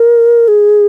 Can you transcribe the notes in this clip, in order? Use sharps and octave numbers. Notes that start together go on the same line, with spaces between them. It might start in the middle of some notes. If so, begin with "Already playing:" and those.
Already playing: A#4
G#4